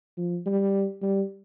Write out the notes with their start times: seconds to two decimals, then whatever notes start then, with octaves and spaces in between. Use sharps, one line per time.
0.17 F3
0.46 G3
1.02 G3